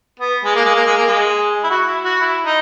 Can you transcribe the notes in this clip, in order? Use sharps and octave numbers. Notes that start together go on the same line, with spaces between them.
B3
G#3
A#3
G#3
A#3
G#3
A#3
G#3
E4
F#4
E4
F#4
E4
D#4